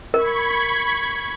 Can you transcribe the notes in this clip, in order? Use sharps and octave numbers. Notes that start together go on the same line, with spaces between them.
A#4 B5 C#6 G#6